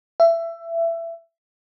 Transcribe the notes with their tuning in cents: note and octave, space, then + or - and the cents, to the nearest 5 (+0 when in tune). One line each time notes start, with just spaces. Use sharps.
E5 +20